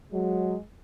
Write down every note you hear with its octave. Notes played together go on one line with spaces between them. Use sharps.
F#3 G#3